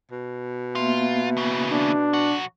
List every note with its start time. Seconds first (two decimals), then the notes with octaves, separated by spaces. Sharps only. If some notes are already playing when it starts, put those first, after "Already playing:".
0.12 B2
0.75 A#3 B3 F4 E5
1.37 C#3 E3
1.71 D4
2.13 B1 F#4